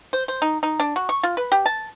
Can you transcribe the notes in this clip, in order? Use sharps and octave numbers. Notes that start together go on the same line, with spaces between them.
C5
C5
D#4
D#4
D4
F#4
C#6
F4
B4
G4
A5